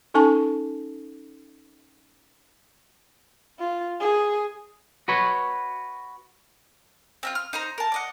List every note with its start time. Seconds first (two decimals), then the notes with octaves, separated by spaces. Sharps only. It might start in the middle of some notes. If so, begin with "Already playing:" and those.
0.14 C#4 D#4 A4 G#5 A5 C#6
3.59 F4
4.00 G#4
5.08 F#4 B4 C#5
7.23 C4 E4 F4
7.35 F6
7.53 D#4 C5 A#5
7.78 A#4 A5
7.92 D5 D#5 F#5